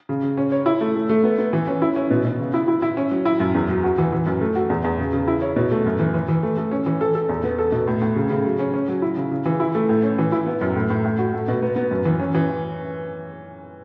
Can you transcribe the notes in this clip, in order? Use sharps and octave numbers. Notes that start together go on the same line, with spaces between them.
C#3
C#3
C#4
C#5
E4
A3
A3
A3
B3
B3
E3
C#4
E4
C#4
B2
B2
C#3
E4
E4
E4
C#4
F#3
E4
F#2
E2
F#3
F#4
E3
E3
F#2
A3
F#4
E2
E2
C#3
C#3
E4
C#5
B2
A3
F#2
E3
E3
E3
A3
A3
C#4
E3
A4
A4
E2
B3
A4
B2
A2
A2
C#3
C#3
F#3
C#4
C#4
F#3
E4
C#3
C#3
E3
E4
A3
A2
C#4
E3
E4
B3
F#2
A2
A2
A2
F#4
A3
B2
B3
B3
F#2
E3
C#4
E3